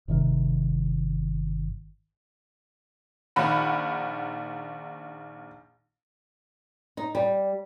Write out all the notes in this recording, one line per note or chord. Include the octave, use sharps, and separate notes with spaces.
G1 C3 D#3
A#1 D#3 F#5 B5
D#4
G3